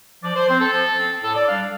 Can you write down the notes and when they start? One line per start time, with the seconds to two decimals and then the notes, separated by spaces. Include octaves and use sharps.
0.23 F3 D5
0.35 C5
0.48 C4 C5
0.60 A4
0.72 F3
0.97 C4
1.22 A2 A4
1.35 D5
1.47 G3 D4 F5